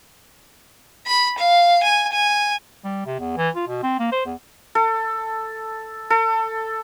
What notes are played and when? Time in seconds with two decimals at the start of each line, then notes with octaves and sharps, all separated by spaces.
1.07 B5
1.38 F5
1.83 G#5
2.12 G#5
2.84 G3
3.06 C3
3.20 E2
3.37 E3
3.55 F4
3.68 B2
3.83 C4
3.99 A#3
4.12 C5
4.26 E2
4.75 A4
6.10 A4